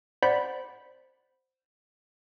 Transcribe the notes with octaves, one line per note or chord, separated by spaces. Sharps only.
C5 D5 F#5 B5 G6 B6